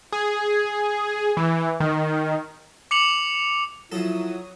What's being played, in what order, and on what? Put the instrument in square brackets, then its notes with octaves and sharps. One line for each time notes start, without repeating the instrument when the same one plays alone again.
[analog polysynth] G#4
E3
D#3
[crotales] D6 C#7 F7 F#7
[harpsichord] F3 A4 [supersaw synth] F#3 D#6 [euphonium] E4